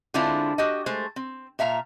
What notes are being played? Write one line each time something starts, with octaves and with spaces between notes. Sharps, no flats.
D3 G#3 C4 D4 E4 F4
F#4 G4 D#5
G#3 A3 C5
C4
A#2 E5 F5 A#5